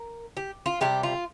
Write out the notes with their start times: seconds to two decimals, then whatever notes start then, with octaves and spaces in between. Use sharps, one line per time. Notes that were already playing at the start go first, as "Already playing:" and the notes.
Already playing: A#4
0.37 G4
0.66 F4
0.81 C3 D#3 G4
0.85 G3
1.03 F4